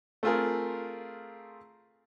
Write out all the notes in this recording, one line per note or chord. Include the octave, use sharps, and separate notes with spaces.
A3 C4 F4 G#4 A#4